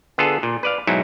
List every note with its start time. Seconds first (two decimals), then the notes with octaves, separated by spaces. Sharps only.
0.18 D3 B3 F4 G#4 A4
0.43 A#2
0.63 B4 D5 F5
0.87 B1 G#2 F#3 D#4 E4